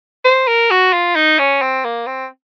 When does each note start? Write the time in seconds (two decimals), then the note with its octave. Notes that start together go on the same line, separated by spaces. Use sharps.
0.25 C5
0.47 A#4
0.70 F#4
0.93 F4
1.16 D#4
1.39 C#4
1.61 C4
1.84 A#3
2.07 C4